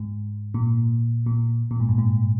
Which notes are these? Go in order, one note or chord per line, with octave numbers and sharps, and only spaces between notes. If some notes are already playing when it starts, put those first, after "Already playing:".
Already playing: G#2
A#2
A#2
A#2
G#2
G2
G#2